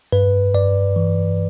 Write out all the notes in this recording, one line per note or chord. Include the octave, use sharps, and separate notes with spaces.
G2 B4
G2 D5
E3